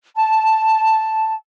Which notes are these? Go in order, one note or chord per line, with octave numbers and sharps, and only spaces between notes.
A5